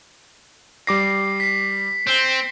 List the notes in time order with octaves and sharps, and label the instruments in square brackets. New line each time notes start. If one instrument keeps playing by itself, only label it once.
[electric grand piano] G3 D6 A#6 [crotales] C7
[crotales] B6 C7
[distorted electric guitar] C4